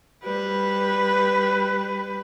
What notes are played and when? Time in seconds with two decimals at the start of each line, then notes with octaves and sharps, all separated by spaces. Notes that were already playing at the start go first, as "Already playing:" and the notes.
0.25 G3 B4